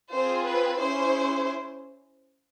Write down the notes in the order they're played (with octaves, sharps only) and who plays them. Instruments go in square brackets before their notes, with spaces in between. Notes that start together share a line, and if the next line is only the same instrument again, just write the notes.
[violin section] C4 F4 G#4 C5
B4
C#4 E4 G#4 C5